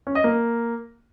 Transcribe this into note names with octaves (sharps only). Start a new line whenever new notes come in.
C#4
D#5
A#3